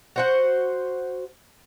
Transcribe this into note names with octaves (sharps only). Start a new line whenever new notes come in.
F#4 C5 F#5